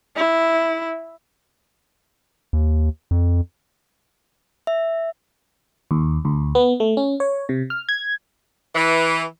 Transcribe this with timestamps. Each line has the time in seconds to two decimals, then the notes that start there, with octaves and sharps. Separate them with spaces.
0.17 E4
2.53 D#2
3.11 F2
4.67 E5
5.91 D#2
6.25 D2
6.55 B3
6.80 A3
6.97 C#4
7.20 C#5
7.49 C3
7.70 F6
7.89 G#6
8.75 E3